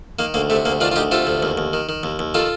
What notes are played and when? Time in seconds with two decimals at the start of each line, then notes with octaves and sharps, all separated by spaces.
0.19 D#3 A#3
0.34 D2 A#3
0.50 C3 A3
0.65 D2 A#3
0.81 D#3 D4 F4
0.92 F4
0.96 D2 D#4 G4
1.11 C3 F4 A4
1.27 D2
1.43 D#2
1.57 D#2
1.73 D#3
1.89 D#3
2.03 D#2
2.19 D#2
2.34 D#3 F4 A4